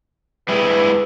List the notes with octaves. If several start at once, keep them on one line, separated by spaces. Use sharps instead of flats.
G3 G#3 E4 B4